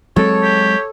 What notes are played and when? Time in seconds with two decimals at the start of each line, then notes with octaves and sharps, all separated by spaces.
0.16 F#3 G#3 C4 A4 C#5
0.42 G4